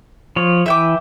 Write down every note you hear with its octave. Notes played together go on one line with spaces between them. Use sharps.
F3 C#5
E3 E5 G5 D6